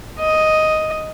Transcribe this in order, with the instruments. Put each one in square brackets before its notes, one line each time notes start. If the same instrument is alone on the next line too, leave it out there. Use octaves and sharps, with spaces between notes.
[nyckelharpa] D#5